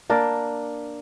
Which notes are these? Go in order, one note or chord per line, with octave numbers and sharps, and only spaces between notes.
A#3 D4 A#4 D5